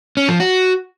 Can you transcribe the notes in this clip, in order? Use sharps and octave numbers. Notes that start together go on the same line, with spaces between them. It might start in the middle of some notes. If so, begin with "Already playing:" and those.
C#4
F3
F#4